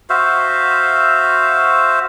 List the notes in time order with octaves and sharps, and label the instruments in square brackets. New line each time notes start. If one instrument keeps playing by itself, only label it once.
[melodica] F#4 C5 E5 F5